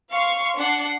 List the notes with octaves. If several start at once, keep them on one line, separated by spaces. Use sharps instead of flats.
F5 C6 C#6
D4 F#5 C7